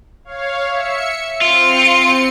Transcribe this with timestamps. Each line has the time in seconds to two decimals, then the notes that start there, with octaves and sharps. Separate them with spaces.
0.25 C#5 F5
0.69 E5 C#7
1.41 C4 F4 C6 C#7